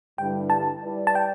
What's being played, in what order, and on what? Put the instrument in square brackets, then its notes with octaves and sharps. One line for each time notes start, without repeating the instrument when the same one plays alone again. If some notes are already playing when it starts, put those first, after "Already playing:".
[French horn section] G2 D3 G3 E4 B4 [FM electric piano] G5
[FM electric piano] A5
[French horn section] G3 E4 B4 D5
[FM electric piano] A5
G5